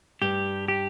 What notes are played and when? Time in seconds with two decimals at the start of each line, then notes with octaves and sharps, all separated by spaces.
0.22 G2 G3 G4
0.68 G4